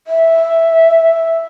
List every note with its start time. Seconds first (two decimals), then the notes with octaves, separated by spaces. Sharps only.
0.07 E5